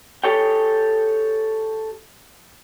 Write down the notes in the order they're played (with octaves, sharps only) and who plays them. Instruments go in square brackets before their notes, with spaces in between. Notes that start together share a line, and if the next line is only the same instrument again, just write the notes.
[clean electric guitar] G4 A4 C#5 G5